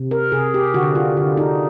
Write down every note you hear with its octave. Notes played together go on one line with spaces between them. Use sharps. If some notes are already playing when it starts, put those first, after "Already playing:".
Already playing: C3
A#4
C3 G#4
G4
D3 F#4
F4
D3
D#4